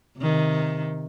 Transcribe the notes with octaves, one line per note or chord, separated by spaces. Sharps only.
C3 D#3